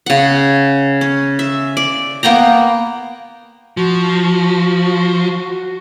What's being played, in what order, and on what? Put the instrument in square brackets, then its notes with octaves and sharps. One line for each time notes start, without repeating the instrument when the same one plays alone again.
[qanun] C#3 F#5
C#4
E5
D5
A#3 B3 G5 A#5
[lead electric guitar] F3 [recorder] F#4